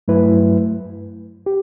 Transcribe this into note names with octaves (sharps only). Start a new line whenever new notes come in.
G2 F#3 A3 E4 B4
G4